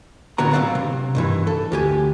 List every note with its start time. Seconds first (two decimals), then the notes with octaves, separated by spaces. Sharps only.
0.38 A2 D3 B3 F#4 A#5
0.53 F#3 C4 F#4 D5 F5
0.75 C3
1.15 B1 G2 E3
1.47 A4
1.72 D2 G4 G#5